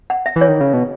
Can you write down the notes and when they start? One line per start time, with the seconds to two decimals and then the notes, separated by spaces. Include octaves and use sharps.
0.10 F#5
0.26 E5
0.36 E3
0.41 C#5
0.49 D#3
0.61 C#3
0.73 B2